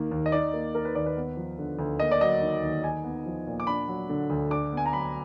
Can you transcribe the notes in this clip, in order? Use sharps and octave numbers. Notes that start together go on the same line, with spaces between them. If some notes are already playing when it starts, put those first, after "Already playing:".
Already playing: D#2 D#3 A#3
D#2
D#5
D#4 D5
A#3
D#3 A#4
B4
D#2 D5
B4
B3
F3
D3
D2
A#3 D#5
D5
F#3 D#5
D#3
D#2
D#4 G#5
B3
F3
A#2
D6
D4 B5
F#3
D3
D2
D4 D6
B3 G#5
A#5
F#3 B5